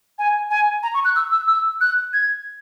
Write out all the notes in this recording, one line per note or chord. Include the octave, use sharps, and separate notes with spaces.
G#5
G#5
A#5
C#6
F#6
E6
E6
E6
F#6
G#6